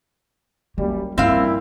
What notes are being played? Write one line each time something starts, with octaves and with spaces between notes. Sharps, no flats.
F#2 G3 A#3
A#1 G2 A#2 C4 E4 F5